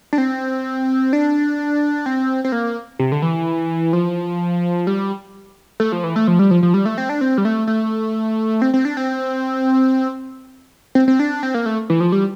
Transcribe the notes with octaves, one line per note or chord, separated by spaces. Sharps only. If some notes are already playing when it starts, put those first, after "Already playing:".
D4
C4
D4
C4
C4
A#3
C3
D3
E3
F3
G3
A3
F3
E3
A3
F3
G3
F3
F3
G3
A3
C4
D4
C4
G3
A3
A3
C4
C4
D4
C4
C4
C4
D4
C4
A#3
A3
E3
F3
G3